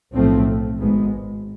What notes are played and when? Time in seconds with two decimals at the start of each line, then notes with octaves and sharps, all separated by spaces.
0.13 B1 A2 F3 A3 C4
0.79 G#1 G#2 G#3 B3